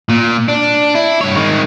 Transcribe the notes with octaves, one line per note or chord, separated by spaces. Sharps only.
A#2
D4
E4
G2 C#5
D#3 G#3